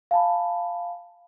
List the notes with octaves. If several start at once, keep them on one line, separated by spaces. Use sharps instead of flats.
F5 G#5 A5 B5